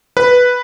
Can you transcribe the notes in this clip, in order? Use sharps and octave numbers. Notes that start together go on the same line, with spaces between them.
B4